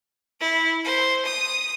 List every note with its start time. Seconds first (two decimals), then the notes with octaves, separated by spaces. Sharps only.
0.40 E4
0.84 C5
1.25 D#6